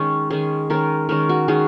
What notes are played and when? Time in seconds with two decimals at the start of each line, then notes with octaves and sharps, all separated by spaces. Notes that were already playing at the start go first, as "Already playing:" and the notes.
Already playing: D#3 G#3 C#4
0.30 D#3 G#3 C#4 G#4
0.70 D#3 G#3 C#4 A#4
1.09 D#3 G#3 C#4 A#4
1.29 F#4
1.48 D#3 G#3 C#4 G#4